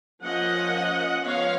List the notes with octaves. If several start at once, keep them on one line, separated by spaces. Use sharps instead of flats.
F3 A#3 C#4 D#5 F#5
F3 G#3 B3 C#5 F5